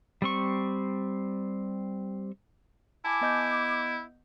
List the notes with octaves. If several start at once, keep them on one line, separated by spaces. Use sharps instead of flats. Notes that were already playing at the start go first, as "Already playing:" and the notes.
G3 C4 C#6
E4 G#5 A5 D6
B3 D#5 G6